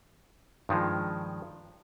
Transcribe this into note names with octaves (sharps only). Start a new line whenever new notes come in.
G2 D#3 F3 G#3